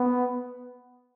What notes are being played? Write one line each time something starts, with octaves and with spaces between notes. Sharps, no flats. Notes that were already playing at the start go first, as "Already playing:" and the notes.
Already playing: B3